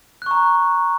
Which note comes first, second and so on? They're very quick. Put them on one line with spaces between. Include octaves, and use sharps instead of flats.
F#6 C#6 A#5